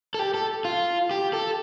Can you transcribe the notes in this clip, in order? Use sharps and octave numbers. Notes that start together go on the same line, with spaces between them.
A4
G4
A4
F4
G4
A4